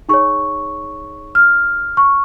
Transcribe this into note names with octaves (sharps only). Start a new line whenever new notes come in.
D#4 G#4 C#5 C#6
F6
C#6